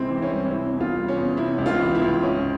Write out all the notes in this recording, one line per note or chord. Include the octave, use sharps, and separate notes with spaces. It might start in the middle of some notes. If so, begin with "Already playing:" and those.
Already playing: C#2 C3 G#3 C4 E4
E3
E4
C#4
G3
C#4
C3 E4
E2
F4
G3
C#4
E2
C3 E4
C#2
F4
E3
E4
C#2
G#2 C#4